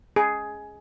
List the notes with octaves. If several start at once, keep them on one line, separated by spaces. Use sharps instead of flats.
G#4